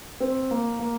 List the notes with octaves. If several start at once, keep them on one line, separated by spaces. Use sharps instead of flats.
C4
A#3
A#3